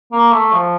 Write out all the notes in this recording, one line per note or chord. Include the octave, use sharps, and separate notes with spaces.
A#3
A3
F3